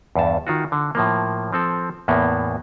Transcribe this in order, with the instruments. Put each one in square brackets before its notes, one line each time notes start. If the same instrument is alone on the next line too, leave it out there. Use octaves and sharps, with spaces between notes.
[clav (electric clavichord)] E2 G2 A5
D#3 F4 F#4
D3
A2 F3 A#3
F3 C4 A4
E2 A2 A#3 B3